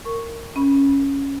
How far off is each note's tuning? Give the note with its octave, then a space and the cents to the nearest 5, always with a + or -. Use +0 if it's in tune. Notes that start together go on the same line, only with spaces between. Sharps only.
A#4 -15 C#6 +0
C#4 +0 B5 -15